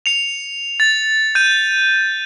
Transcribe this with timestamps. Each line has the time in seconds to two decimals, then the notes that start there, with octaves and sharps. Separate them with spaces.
0.06 C#7 F7
0.80 A6
1.35 G6 D#7